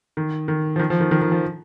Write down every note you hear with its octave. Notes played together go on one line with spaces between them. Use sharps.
D#3
D#3
F3
D#3
F3
D#3
D#3
D#3
F3